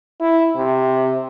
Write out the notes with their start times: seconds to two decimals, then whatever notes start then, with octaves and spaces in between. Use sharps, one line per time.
0.21 E4
0.56 C3